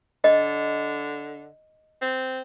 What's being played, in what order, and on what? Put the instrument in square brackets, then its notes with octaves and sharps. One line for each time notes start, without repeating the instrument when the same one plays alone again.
[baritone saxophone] D3 [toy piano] D#5
[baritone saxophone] C4